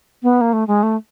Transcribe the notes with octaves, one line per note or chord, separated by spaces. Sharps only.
B3
A#3
A3
G#3
A3